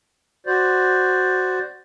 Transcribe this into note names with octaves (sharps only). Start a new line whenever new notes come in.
F#4 C5 D5